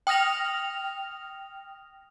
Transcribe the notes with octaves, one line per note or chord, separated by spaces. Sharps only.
G5 D#6 F6 A#6 F7